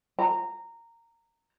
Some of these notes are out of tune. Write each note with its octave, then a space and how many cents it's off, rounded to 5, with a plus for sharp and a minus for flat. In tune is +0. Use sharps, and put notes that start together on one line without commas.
A#5 -15